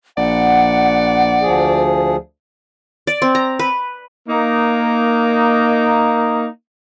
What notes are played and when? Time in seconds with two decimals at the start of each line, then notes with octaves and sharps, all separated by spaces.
0.18 A#1 D5 F#5
1.41 D2 F3 G#4
3.07 D5
3.22 C4
3.35 A#5
3.59 B4
4.29 A#3 D#4